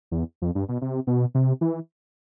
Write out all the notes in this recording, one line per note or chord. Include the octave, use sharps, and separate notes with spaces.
E2
F2
G2
B2
C3
B2
C3
E3